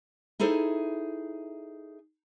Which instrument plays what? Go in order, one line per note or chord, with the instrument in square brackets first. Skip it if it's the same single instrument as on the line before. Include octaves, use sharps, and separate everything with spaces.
[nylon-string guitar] D#4 E4 G#4 A4 C5